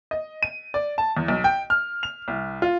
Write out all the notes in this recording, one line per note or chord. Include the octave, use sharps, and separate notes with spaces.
D#5
D#7
D5
A5
E2
B1
G5
F6
F7
C2
F4